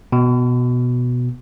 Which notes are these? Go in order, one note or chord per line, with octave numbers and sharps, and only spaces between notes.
B2